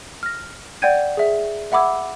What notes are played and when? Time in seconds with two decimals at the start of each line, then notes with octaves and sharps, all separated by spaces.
0.23 F6 A#6
0.82 D5 F#5 G5 G6 G#6 D#7
1.17 G#4 E5
1.72 E5 F#5 B5 D6 E6 G#6